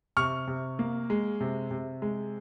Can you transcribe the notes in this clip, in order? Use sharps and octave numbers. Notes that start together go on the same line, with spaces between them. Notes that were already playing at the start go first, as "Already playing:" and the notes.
C3 C#6 F6
C3
A#3
G#3
C3
C3
G#3